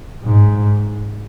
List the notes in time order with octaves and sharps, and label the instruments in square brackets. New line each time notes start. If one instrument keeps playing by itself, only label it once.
[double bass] G#2